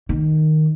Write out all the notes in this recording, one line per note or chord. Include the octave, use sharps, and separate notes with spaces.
D#3